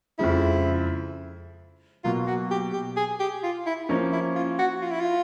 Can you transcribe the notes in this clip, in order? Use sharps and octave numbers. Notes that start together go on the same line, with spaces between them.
F2 C#3 F3 G#3 E4
B2 F#3 A#3 F4
F#4
G4
G4
G#4
G4
F4
E4
F3 A#3 C#4 D#4
E4
F4
F#4
F4
E4
F4